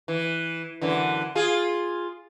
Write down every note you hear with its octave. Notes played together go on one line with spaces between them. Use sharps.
E3
F#2 D3 E3
F4 G#4